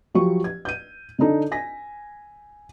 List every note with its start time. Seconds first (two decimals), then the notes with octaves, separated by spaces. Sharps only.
0.15 F3 F#3 G4 C#6
0.44 G#6
0.65 G6 D#7
1.19 D3 D4 D#4 A4
1.51 G#5 A#6 B6